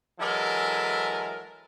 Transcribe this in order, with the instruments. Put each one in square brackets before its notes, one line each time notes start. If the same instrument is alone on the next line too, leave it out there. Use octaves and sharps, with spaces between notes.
[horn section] E3 F#3 G#3 E4 A4 A#4